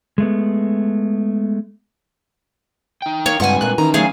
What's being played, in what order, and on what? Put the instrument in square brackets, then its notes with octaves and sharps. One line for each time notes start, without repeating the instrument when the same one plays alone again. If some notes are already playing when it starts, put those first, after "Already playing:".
[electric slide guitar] G#3 A3 B3
D#4 G5
[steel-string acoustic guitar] A#3 [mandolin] C#5
[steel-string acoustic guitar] G2 C#3 F#5 [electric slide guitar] G#3 C4 F4 [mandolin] G#5 C#6
[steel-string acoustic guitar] G2 A#2 A#3 [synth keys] F#6
[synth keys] D#3 [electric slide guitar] E3 C#4 [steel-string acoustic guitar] A#5
[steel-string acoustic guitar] F#3 A3 [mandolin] G#4 F5